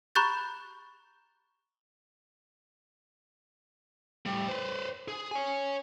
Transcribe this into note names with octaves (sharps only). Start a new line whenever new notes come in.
A#5 B5 C#6 F#6 G6 A6
A2 G3
B4 C5
G#4
C#5 G#5